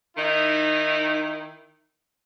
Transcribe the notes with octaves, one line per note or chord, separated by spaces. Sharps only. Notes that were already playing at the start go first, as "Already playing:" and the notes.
D#3 D#4 E4